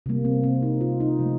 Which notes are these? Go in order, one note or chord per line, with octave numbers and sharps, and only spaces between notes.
C3 G3 A#3
C4
C4
D#4
F4
D#4
C3 F3 A3